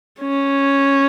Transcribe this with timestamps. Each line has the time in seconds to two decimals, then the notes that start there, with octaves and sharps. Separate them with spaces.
0.20 C#4